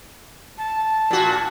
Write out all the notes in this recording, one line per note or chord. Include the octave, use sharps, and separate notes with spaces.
A5
A#2 F#4